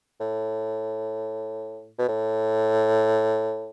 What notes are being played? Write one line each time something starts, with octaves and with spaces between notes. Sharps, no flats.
A2
B2
A2